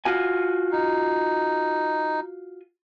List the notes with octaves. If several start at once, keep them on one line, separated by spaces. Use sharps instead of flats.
F4 F#4 G#5
D#4